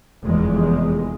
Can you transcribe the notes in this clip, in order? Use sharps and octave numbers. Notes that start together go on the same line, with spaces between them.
F1 E2 G#3